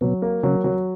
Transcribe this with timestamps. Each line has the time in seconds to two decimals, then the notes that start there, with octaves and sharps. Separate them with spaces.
0.01 B2 F#3 B3
0.22 A#3
0.43 C#3 F#3 C#4
0.64 F#3